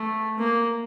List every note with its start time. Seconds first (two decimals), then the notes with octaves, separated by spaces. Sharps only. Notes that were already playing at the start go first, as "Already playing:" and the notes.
Already playing: A3
0.39 A#3